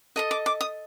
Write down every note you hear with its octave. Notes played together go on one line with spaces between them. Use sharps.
A4 D#5 D#6
D6
D6
D#6